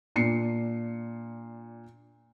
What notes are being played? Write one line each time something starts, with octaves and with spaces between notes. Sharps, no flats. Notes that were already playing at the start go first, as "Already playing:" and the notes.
A#2 D4 C7 C#7